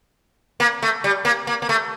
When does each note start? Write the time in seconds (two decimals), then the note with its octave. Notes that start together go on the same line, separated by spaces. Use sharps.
0.60 A#3
0.82 A3
1.04 G3
1.25 A#3
1.47 A#3
1.62 A#3
1.69 A3